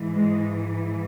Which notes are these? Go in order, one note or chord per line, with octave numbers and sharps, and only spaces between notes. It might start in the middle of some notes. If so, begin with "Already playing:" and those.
Already playing: G#2 E3
G#3